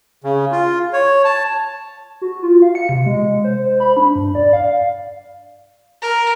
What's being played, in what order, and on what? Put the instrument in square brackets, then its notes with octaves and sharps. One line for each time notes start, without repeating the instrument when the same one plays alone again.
[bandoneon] C#3
F4
C#5
A5
[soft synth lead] F#4
F4
F5
C#7
C3
G#3
C5
B5
D4
G2
D5
F5
[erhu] A#4